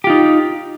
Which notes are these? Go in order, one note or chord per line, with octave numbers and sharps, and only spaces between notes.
D#4 F4 G4